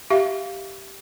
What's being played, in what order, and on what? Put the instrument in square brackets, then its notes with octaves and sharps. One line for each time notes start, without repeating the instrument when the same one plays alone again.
[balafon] G4 E5 F5